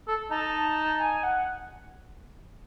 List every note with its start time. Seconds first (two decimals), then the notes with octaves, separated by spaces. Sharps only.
0.08 A4
0.31 D#4 A5
1.00 G#5
1.23 F#5